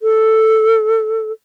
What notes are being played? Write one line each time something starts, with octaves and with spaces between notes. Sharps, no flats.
A4